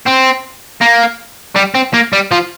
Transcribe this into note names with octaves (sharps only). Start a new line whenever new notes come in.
C4
A#3
G3
C4
A#3
G3
F3